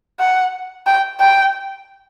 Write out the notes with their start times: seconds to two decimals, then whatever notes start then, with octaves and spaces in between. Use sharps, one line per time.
0.20 F#5
0.87 G5
1.20 G5